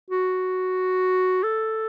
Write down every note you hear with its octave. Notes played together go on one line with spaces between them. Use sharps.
F#4
A4